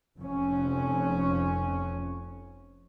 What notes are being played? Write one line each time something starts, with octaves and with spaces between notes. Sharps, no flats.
F1 F2 C#4